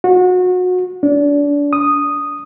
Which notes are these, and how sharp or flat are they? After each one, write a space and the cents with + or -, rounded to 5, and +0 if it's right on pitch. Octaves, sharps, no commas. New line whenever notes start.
F#4 -25
D4 -30
D#6 -5